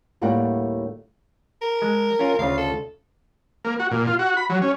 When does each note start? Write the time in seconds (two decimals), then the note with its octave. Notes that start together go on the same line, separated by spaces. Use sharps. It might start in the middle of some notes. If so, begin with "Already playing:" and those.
0.21 D2 A2 G3 A#3 F#5 G5
1.62 A#4
1.82 G#3
2.19 C#4 F4
2.39 D2 C#3 F4 F5
2.58 A4
3.65 A#3
3.79 F#4
3.91 A#2
4.07 F4
4.19 F#4
4.37 B5
4.50 F#3
4.62 C#4